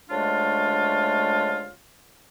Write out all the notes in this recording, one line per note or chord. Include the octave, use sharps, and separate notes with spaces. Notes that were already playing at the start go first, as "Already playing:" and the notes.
D2 C#3 G#3 A3 D4 F4